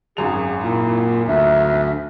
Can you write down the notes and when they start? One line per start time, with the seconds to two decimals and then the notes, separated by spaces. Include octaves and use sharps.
0.17 G#1 F#2 G#4 F7
0.63 A#2 E4
1.28 D2 E5